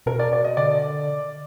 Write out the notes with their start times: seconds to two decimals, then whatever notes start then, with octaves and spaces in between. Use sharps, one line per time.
0.06 B2 A#4
0.19 D5
0.33 D5
0.44 D#5
0.57 D3 D5